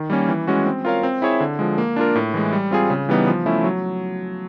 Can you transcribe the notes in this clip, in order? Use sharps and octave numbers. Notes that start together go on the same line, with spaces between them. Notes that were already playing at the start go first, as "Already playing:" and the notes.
Already playing: D#3
G3 A#3 C#4
E3
G#3 C#4 F#4
C4
F4 A#4 C#5 F5
C4
E4 G#4 C#5 E5
D3
F3 G#3
A#3
D4 F4 A#4
A2
E3 G#3
G3
C4 F4 G#4
C#3
E3 G3 B3 D#4
F3
A3 C#4 E4
F#3